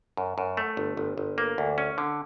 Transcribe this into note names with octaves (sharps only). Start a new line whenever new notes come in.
F#2
F#2
A3
G1
G1
G1
A#3
D2
C#4
D3